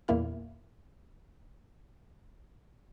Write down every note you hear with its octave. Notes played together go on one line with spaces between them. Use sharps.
E2 A#2 A#3 E4 F6